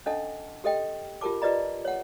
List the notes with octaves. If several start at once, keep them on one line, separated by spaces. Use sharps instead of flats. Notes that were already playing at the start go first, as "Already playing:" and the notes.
C#4 D4 A4 D#5 F#5 A5
G4 A4 D#5 G5
F4 G4 A#4 A5 D6
F4 G4 B4 D5 D#5 A#5
C#5 F#5